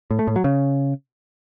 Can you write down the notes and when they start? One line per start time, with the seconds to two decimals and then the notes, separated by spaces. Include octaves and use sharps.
0.11 A2
0.19 A3
0.27 A2
0.36 F#3
0.44 C#3